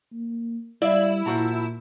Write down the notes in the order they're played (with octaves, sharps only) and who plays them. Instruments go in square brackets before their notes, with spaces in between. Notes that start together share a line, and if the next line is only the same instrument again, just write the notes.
[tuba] A#3
[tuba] G3 [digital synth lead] E4 [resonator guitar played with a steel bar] D5 E5 F5
[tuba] A#2 [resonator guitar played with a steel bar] F3 F#4 A#5